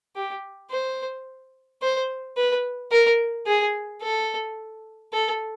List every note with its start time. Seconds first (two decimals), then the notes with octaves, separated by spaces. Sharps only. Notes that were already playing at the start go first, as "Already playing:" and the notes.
0.16 G4
0.71 C5
1.82 C5
2.37 B4
2.92 A#4
3.47 G#4
4.02 A4
5.13 A4